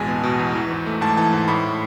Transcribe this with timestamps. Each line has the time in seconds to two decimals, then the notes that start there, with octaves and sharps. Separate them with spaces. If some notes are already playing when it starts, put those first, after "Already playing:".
Already playing: A1 E2 B2 G#3 G#5 A5
0.08 B3
0.23 B2
0.39 E2
0.55 E3
0.71 G#2
0.86 A3
1.01 G#2 A5
1.17 E3 A5
1.33 G#2
1.48 A2 B5